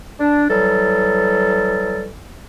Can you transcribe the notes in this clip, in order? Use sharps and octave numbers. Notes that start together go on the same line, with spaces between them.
D4
E3 F#3 G3 A4